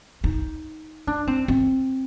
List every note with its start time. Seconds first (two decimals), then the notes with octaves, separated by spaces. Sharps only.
0.24 D#4
1.07 D4
1.27 C4
1.48 C4